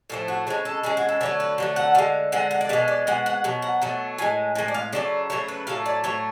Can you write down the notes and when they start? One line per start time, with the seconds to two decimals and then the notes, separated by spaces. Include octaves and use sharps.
0.10 A2 F3 A3 C#4
0.28 F#4
0.47 C#3 G#3 C#5
0.65 A4
0.83 C#3 G#3 G#4
0.97 F#4
1.09 A4
1.21 D3 F#3 A3 C#5
1.40 B4
1.58 D3 F#3 A3
1.76 F#5
1.95 D3 G#3 F5
2.32 D3 G#3 F#5
2.51 F#5
2.61 D5
2.69 B2 G#3 F5
2.88 D5
3.07 B2 G#3 F#5
3.26 F#5
3.44 B2 F#3
3.62 F#5
3.82 B2 F#3 A3
4.18 A2 G#3 G#5
4.55 A2 G#3 G#5
4.68 D5
4.74 F5
4.93 C#3 F#3 A3 D5
5.30 C#3 F#3 A3 C#5
5.48 B4
5.67 A2 F#3 A3 F5
5.86 D5
6.04 A2 F#3 A3 C#5